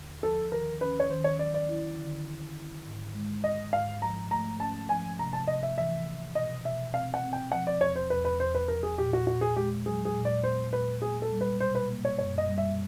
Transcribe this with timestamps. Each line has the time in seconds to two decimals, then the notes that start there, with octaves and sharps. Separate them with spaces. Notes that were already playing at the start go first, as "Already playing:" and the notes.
Already playing: D#2 D3
0.23 F3 A4
0.52 D#3 A#4
0.81 C#4 B4
1.00 C#5
1.10 D#3 C5
1.24 C#5
1.39 F#3 D5
1.54 D5
1.69 E4
1.98 D3
2.27 D3
2.56 E4
2.86 G#2
3.14 G#3
3.43 G#3 D#5
3.73 G#2 F5
4.02 F3 A#5
4.31 A3 A#5
4.60 C#4 A5
4.89 F3 G#5
5.19 C3 A#5
5.33 A5
5.47 C3 D#5
5.63 E5
5.77 E3 E5
6.06 E3
6.35 B2 D#5
6.64 B2 E5
6.94 C4 F5
7.14 F#5
7.23 C4
7.33 G5
7.52 F3 F#5
7.67 D5
7.81 E2 C#5
7.96 C5
8.10 E2 B4
8.25 B4
8.40 E2 C5
8.55 B4
8.68 F3 A#4
8.83 G#4
8.98 A#2 G4
9.13 F#4
9.27 A#2 F#4
9.41 G#4
9.56 G#3 G4
9.86 F#3 G#4
10.05 G#4
10.15 A#2
10.25 D5
10.44 B3 C5
10.73 A#2 B4
11.02 A#3 G#4
11.22 A4
11.32 G3
11.41 B4
11.60 B2 C5
11.75 B4
11.90 A#3
12.05 C#5
12.18 F#2 C#5
12.38 D#5
12.48 G3
12.58 E5